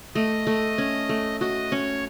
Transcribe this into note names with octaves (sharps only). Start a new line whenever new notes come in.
A3 D#5
A3
C#4
A3
F#4 D#5
C#4 C#5